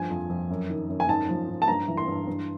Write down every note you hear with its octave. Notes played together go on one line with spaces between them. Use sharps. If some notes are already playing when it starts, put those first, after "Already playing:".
Already playing: G2 F3 G#5
F2
F2
F#2
D#3
F#2
G#5
G#2 A5
F3
G#2
A5
G2 A#5
E3
C6
G2
G2